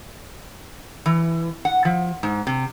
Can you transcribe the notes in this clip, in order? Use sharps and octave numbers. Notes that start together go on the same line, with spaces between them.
E3
F#5
F3
G#2
C3